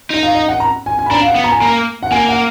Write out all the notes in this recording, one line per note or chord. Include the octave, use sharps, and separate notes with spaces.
D#4 D#5
F5
D#5
F#5
A#5
G#5
G#5
B5
D4 A#5
F5
F#5
B3
A#5
G#5
A#3 A#5
F#5
A#3 G#5
F#5